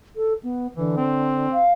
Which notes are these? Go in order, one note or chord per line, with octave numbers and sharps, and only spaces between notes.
A4
B3
D3 E3
C4
F5